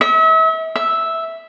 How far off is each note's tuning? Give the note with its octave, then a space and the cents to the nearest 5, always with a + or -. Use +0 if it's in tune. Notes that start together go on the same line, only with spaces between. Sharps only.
E5 -40
E5 -5